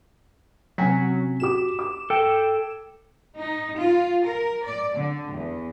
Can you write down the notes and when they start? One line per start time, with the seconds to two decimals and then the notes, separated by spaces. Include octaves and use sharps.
0.78 C3 F#3 C#4 G#5 B6
1.40 F#4 G4 D6 E7
1.79 D6
2.10 A4 G5
3.38 D#4
3.79 F4
4.25 A#4
4.64 D5
4.96 D3
5.32 E2